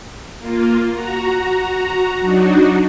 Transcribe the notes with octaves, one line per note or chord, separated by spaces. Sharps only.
A#3 F4
F#4 A#5
F#3 D4 D#4 F#4